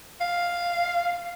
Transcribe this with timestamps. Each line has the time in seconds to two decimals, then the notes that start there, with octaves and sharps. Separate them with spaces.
0.21 F5